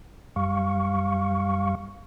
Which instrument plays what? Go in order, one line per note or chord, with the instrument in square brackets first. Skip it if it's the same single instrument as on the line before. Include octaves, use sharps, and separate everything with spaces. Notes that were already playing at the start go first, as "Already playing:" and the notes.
[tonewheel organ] F#2 G3 F5 C#6